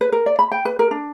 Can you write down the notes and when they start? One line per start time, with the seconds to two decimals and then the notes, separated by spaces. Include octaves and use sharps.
0.01 B4
0.12 A#4
0.26 D5
0.39 B5
0.51 G5
0.65 B4
0.79 A#4
0.91 D4